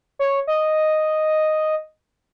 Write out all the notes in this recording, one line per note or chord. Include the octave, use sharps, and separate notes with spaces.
C#5
D#5